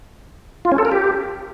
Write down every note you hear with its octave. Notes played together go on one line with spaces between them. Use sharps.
F4
C#4
A4
A#4
G4